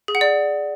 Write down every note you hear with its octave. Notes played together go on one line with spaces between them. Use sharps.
G#4
F#5
D5